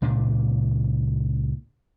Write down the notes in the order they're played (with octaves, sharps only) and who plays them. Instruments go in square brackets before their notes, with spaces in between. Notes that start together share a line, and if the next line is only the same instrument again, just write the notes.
[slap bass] C#2 A#2 D4